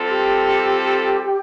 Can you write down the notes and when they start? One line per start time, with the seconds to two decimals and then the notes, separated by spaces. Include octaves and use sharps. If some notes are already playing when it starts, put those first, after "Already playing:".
Already playing: G3 C4 F4 A4
0.10 G4